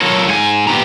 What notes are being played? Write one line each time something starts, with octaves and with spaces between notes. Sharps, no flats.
F#3 F4 A4 A#4 C#5
G#2 G#4 G#5
A#2 B3 G4 A#5